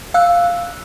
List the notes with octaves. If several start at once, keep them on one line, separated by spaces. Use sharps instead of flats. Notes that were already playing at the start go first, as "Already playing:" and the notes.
F5 E6 F#6